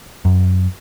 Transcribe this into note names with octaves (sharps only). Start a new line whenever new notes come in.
F#2